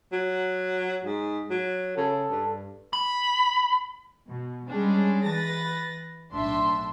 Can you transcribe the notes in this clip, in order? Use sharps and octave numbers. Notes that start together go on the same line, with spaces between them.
F#3
G#2
F#3
C#3 A4
G2
B5
B2
G3 G#3 C#4 D4 G#4
E3 B4 A6 A#6
B1 A2 D4 E5 C6